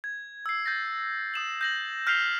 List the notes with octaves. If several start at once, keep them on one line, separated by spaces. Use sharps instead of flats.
G#6
E6 C7
G6 A6 A#6
D#6 E7 F#7
G6 A#6 F#7
F6 G6 B6 C7 F7 G7